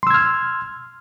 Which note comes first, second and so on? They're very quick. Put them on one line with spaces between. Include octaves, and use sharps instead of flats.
C6 E6 G#6 F6